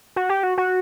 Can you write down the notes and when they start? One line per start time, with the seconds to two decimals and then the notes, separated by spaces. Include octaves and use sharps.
0.16 F#4
0.29 G4
0.43 F#4
0.58 F#4